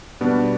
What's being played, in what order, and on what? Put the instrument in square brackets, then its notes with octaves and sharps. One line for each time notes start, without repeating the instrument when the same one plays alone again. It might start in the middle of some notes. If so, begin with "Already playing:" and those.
[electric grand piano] B2 G3 B3 D4